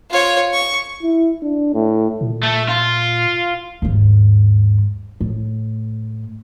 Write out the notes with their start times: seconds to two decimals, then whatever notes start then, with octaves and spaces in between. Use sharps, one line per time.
0.10 F4 C#5
0.53 C#6
1.03 E4
1.43 D4
1.74 A2
2.21 A#2
2.43 A3
2.69 F4
3.82 D#2 G#2
5.21 A2